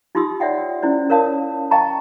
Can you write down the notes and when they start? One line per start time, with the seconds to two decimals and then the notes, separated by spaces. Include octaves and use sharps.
0.15 D#4 F4 G4 C6 D#6 E6
0.40 C#5 D5 E5 F#5 G5
0.82 C#4 E4 C5 D5
1.10 A#4 C#5 F5 A5 D#6
1.71 D#5 F5 G5 A5 A#5 C#6